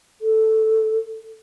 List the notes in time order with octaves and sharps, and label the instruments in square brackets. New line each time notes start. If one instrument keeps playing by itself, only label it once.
[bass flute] A4